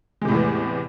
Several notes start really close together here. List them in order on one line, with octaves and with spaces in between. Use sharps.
G#3 C3 A2 E2 E3